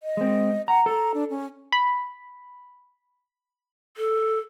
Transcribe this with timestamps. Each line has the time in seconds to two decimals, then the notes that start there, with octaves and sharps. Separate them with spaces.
0.03 D#5
0.17 G#3 C4
0.68 F#5 A#5
0.86 A4 A#5
1.14 D4
1.30 C#4
1.72 B5
3.97 A4